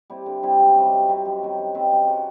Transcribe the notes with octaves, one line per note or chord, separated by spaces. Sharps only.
G3 C4 E4
D3
G3 C4 E4
F#2
D#3 G3 C4
F#2
D#3 G3 C4
F#2
D#3 G3 C4
F#2
D#3 G3 C4
F#2
C#3 F#3